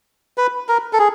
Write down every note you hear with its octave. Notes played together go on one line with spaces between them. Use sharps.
B4
A#4
A4
G#4